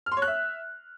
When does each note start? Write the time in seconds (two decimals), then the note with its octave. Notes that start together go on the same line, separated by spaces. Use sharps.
0.06 F6
0.12 C6
0.17 C#5
0.22 F#6
0.27 E5